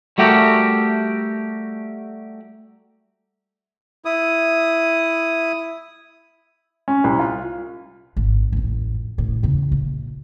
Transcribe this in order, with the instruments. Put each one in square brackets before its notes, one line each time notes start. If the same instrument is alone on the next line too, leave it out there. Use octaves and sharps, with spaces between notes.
[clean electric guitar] G3 A3 F#4 G4 A4 A#4
[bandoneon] E4 D#6
[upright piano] C#4
C2
F4
[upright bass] G#1
A1 F2
A1 A2
E2 C#3
A#1